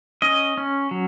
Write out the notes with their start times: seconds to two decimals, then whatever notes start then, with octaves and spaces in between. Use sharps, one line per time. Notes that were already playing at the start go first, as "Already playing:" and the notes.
0.22 C#4 D#5
0.57 C#4
0.91 F#3